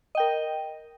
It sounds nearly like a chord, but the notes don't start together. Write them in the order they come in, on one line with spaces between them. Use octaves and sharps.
D#5 G5 A#4